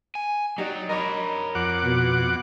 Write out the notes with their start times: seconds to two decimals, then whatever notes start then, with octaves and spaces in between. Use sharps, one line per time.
0.15 G#5
0.58 F#3 D#4 G4 D5
0.89 A#4 C#5 D#5 B5 D6
1.55 F2 F#5 D6
1.85 B2 B4